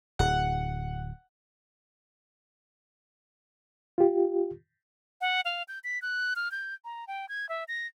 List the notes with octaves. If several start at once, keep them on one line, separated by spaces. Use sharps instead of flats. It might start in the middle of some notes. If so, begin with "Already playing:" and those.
D1 F#5
F4 G4
F#5
F5
G6
B6
F#6
F6
G6
A#5
G5
G#6
E5
A#6